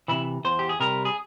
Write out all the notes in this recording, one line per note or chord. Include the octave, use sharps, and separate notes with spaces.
C3 E3 E4
E2 C5
G4
G#4
C3 G3 A#4
G#4